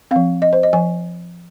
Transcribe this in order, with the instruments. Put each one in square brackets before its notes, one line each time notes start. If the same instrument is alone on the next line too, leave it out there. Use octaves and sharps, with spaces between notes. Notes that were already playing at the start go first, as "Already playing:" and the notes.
[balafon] F3 C4 F5
D#5
C5
D#5
F3 G#5